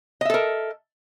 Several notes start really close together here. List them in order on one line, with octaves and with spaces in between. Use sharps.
D#5 E5 A4 A#4